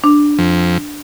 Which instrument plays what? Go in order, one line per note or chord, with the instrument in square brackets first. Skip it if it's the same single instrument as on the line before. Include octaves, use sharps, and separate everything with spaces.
[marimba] D4
[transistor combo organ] F2